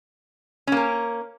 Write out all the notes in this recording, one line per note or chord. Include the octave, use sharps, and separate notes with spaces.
A#3 C#4 A#4